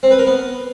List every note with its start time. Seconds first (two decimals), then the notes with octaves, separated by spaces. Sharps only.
0.03 C4
0.11 B4
0.19 A#4
0.26 B3